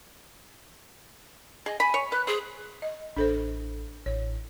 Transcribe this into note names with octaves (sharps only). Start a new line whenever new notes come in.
G#4 D#5
G#5 B5
C#5
B4 F#6
G#4 C5
D#5
A1 D4 A4 C5
A1 C#5